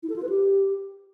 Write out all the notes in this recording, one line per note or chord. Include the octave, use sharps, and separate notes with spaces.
E4
A4
F4
B4
G4